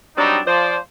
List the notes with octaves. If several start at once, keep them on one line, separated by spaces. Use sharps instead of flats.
F#3 G3 C4 D4 D#4
F3 C5 D5